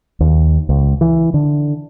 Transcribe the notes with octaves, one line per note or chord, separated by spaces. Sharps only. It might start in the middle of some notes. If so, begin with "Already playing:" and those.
D#2
C#2
E3
D3